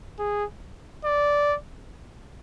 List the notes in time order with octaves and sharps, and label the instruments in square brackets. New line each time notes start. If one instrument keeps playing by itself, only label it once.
[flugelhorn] G#4
D5